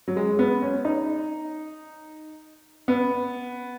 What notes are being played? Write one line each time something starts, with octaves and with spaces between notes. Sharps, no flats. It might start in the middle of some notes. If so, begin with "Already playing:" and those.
F#3
G#3
B3
C#4
D#4
B3